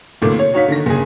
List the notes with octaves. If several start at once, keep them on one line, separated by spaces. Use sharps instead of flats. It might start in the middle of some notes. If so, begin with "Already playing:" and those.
F1 D2 A2 A#3 D6
C#5
D#4 F#4 C#5 F5 B6
D3 D#3 A#6
F#1 G#4